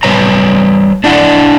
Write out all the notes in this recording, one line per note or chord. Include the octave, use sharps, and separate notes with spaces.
G3 B4 C#5 A#5
D4 E4 D5 F#5